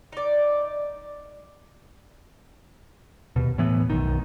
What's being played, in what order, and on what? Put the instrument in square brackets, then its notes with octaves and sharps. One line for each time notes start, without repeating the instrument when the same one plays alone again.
[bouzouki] D#4 D5
[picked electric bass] D#2 B2
A2 E3 B3
B1 F#2 D#3